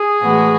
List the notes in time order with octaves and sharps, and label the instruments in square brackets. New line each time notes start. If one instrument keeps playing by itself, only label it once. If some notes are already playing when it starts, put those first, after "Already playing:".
Already playing: [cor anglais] G#4
[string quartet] A2 E3 G#3 B3 F#4